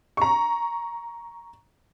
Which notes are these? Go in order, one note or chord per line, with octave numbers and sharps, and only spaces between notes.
A#5 C#6